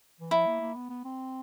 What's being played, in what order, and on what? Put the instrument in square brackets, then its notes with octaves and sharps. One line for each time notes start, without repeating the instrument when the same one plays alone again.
[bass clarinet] E3
[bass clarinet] F3 [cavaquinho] E4
[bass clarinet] A#3
A#3
B3
B3
C4